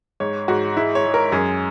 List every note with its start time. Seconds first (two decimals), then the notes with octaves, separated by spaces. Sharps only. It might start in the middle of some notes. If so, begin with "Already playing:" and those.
0.20 G#2 C#5
0.48 G#2 F#4
0.77 G#3 E4
0.95 C#5
1.05 G#3
1.14 A#4
1.32 F#2 G#4